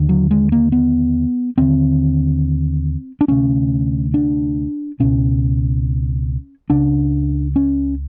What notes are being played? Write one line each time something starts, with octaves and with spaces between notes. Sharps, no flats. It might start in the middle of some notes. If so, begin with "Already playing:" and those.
Already playing: D#2 D3
F#3
G#3
A#3
B3
D#2 D3 C4
D4
D2 C3 C#4
D4
C#2 B2 C#4
C#2 C#3 D4
C#4